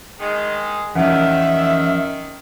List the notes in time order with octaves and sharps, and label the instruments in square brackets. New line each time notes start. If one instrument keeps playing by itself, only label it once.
[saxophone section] D#3 G#3
[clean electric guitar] E2 F3 [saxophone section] D#3 [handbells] C#4 F#5 [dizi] E5